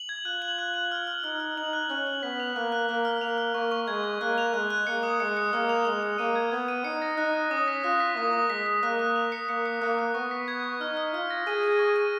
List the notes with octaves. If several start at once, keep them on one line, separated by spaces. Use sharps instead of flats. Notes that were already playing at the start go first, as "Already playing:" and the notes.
Already playing: F#7
G#6
F4 F#6
F#7
F#6
F#6
F6
F6
D#4 F6
F6
D#4 F#7
F#6
C#4 F#6
F#7
B3 B6
F7
A#3 F#6
F#6
A#3 F6
F6
A#3 F7
F6
A#3 C#6
C#6
G#3 G#6
C#6
A#3 F#6
F7
G#3 F#6
F#6
A#3 C#7
D#6
G#3 C#7
C#7
A#3 F6
F7
G#3 F7
F7
A#3 D#7
G#6
B3 G#6
D#7
D#4 C#7
A#6
D#4 F#6
F#6
C#4 D#6
B6
F4 F#6
B6
A#3 D#6
D#6
G#3 B6
B6
A#3 F#6
F#6
F7
C#7
A#3 C#7
C#7
A#3 F#6
F#6
B3 C#6
B6
G#6
C#6
D#4 F6
F6
F4 F6
A#6
G#4 D#7
D#7
C#6
D#7